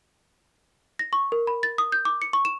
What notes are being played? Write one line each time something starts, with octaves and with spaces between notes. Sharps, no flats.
A#6
C#6
A#4
B5
A6
D#6
G6
D6
C#7
C#6
E7